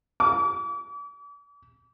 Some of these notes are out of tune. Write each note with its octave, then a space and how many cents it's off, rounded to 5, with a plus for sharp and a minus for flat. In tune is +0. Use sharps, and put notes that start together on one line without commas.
D6 -40